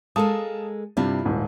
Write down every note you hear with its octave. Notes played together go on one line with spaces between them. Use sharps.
G#3 A4 A#4 F5 A5 D#6
G2 C3 G3 E4 F4
D#1 G#2